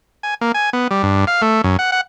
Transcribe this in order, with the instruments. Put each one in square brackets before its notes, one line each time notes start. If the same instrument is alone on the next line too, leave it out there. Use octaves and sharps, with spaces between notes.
[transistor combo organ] G#5
A#3
G#5
B3
G3
G2
F5
A3
F#2
F#5
F#5